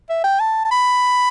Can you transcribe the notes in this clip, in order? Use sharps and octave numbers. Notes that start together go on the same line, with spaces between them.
E5
G5
A5
A5
B5